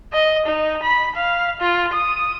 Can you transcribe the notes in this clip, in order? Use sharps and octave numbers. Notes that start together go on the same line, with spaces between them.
D#5
D#4
B5
F5
F4
D#6